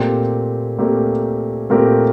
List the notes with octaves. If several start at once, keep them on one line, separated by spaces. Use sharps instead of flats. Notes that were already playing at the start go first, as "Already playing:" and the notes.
Already playing: A#2 A3 C4 G4 A#4
A#2 A3 C4 G4 A#4
A#2 A3 C4 G4 A#4